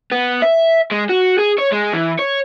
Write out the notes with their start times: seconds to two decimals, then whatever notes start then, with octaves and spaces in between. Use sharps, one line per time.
0.12 B3
0.42 E5
0.91 G#3
1.09 F#4
1.39 G#4
1.59 C#5
1.72 G#3
1.93 E3
2.19 C#5